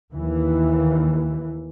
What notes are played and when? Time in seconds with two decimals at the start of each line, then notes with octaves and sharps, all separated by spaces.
0.13 D#2 E3